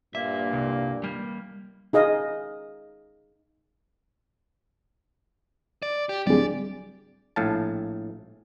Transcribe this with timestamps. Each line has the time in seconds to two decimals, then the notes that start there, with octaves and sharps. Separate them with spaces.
0.15 G2 A#2 A#3 E5
0.53 C2
1.04 G3 A#3
1.93 D#4 G#4 D#5 F5
5.83 D5
6.09 G4
6.27 D1 G3 G#4 D5
7.36 A#1 A2 F5 A5